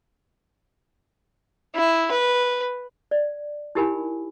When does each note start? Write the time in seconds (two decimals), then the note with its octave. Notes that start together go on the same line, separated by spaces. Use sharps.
1.75 E4
2.11 B4
3.11 D5
3.75 D#4 E4 G4 A#4 G#5 B5